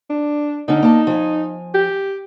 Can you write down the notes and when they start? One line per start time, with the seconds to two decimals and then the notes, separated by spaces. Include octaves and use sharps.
0.10 D4
0.68 D3 C#4 D#4
0.83 A#3 A5
1.07 F3 G#5
1.74 G4